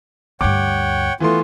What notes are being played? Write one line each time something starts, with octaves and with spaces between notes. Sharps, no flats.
D2 G2 C#5 F#5 G5 D6
E3 A3 B3 F4 C6